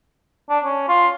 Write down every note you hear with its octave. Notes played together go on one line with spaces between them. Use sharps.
D4
C#4
F4